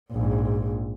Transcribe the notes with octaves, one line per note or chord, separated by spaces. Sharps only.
A#1 G#2